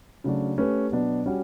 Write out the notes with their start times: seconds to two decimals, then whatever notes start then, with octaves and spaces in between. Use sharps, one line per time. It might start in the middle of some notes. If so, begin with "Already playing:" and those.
0.24 C#3 F#3 A3 D4 F#4
0.58 A3 C#4 G4 B4
0.92 B2 F#3 B3 D4
1.26 G3 C#4 F#4